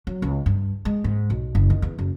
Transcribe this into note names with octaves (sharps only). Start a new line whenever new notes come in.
F#3
C#2
G2
G#3
G#2
B1
F#1
D#3
E2
F#1